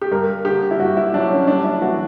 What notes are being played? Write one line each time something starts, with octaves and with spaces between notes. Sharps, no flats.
G4
G2 A#4
D3 G4
E4
G2 F#4
E4
F#3 D4
C#4
G3 D4
E4
E3 F#4